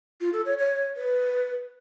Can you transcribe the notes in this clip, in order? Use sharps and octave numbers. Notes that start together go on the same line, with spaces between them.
F4
A4
C#5
C#5
B4